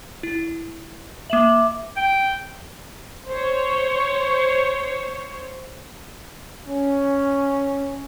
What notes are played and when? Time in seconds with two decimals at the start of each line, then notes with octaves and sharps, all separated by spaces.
0.23 E4
1.30 A#3 E5 D6 E7 F#7
1.96 G5
3.29 C5 C#5
6.68 C#4